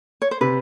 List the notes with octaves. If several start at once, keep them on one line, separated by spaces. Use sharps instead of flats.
C#5
C5
C3 B4